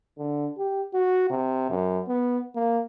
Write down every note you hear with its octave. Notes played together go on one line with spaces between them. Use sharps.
D3
G4
F#4
C3
F#2
B3
A#3